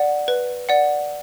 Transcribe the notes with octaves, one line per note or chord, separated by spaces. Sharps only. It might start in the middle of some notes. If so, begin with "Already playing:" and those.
Already playing: D5 F#5
B4
D5 F#5